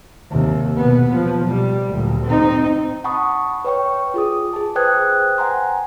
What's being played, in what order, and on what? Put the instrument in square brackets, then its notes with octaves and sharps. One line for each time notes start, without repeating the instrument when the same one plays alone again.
[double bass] D#2 C3
B2 B3
F3
B2 G3
D2 A#2
C4 D#4
[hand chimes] F#5 A5 B5 C#6 D#6
B4 C#5 G5 C#6
F4 G#4 D#6
G#4 A5
B4 C5 G5 D#6 F#6 G#6
F#5 G#5 A#5 C6